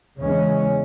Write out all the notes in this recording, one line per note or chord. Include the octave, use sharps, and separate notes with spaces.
E2 C#3 G#3 C#4